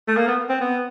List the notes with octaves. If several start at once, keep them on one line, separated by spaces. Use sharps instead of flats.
A3
A#3
B3
C4
B3